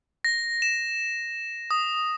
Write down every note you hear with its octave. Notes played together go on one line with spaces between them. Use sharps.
A#6
E7
D#6